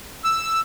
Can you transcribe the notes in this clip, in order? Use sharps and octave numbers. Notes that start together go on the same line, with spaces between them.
E6